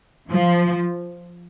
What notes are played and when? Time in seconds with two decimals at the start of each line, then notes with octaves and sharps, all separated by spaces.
0.31 F3